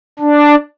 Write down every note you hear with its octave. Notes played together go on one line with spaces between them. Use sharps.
D4